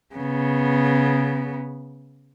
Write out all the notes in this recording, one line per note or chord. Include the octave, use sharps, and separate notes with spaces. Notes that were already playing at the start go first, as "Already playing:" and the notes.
C#3 B3